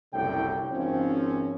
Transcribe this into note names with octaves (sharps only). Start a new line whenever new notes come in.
F#1 C2 A2 D3 F#3 G5
G#1 F3 C4 C#4